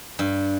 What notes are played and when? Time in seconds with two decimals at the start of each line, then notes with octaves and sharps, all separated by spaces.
0.19 G2